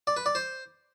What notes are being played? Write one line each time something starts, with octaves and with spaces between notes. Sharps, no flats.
D5
B4
D5
C5